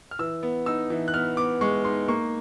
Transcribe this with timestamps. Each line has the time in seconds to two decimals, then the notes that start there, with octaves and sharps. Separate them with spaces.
0.11 F6
0.19 E3 E6
0.43 B3
0.66 D#4 E6
0.90 E3
1.08 F#6
1.14 B3 F6
1.37 B3 D6
1.61 G#3 C#6
1.85 D#4 C6
2.08 A#3 C#6